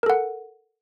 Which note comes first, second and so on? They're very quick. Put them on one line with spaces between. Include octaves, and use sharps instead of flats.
A#4 A4 F#5